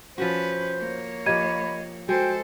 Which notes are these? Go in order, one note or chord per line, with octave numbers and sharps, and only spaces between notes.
F3 C#4 F#4 B4 C5
A#3 C#5
F3 G4 D#5 B5 G#6 D#7
G#3 F#4 A4 C5 G5